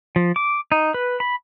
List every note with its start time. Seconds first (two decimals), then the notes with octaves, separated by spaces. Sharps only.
0.16 F3
0.36 D6
0.72 D#4
0.94 B4
1.20 B5